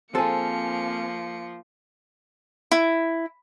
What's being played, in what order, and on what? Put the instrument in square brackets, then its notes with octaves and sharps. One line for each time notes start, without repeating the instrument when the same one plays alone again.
[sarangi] F3 [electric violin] A#3 C#7 [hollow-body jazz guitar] C4 G#4 [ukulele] A4
[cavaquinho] E4